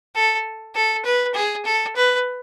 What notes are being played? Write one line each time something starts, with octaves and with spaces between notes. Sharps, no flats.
A4
A4
B4
G#4
A4
B4